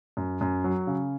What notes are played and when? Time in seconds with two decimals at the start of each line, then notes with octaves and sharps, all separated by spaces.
0.17 F#2
0.41 F#2
0.64 F#3
0.87 C#3